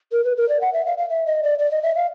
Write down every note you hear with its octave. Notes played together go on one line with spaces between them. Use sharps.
A#4
B4
A#4
D5
F#5
E5
F5
F5
E5
D#5
D5
D5
D#5
E5
F5